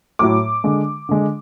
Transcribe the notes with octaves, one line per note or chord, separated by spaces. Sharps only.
A2 F#3 A3 D6
D3 G#3
D3 G#3